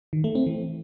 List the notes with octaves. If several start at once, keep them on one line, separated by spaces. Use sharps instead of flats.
D#3
A3
C4
E3